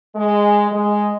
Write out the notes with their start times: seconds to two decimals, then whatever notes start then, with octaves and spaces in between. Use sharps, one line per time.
0.15 G#3
0.71 G#3